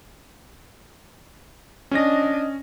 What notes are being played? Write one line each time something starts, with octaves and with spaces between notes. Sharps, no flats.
C#4 D4 D#5 A#6